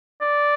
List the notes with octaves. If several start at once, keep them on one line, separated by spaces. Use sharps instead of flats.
D5